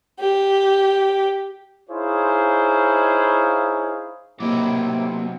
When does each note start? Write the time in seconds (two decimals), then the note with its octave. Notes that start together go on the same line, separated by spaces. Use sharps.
0.19 G4
1.90 D#4 E4 G#4 C5 C#5 F5
4.40 A2 C3 F#3 A#3 D#4 E4 D6